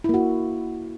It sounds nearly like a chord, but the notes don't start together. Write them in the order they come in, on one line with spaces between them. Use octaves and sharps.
E4 A#3 F#4